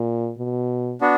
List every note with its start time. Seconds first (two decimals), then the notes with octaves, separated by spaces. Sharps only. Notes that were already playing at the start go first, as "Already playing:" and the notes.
Already playing: A#2
0.39 B2
1.01 B3 D4 F#4